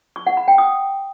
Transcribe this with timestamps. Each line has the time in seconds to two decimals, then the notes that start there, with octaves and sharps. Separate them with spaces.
0.16 C#6
0.27 F#5
0.37 B5
0.48 G5
0.58 D#6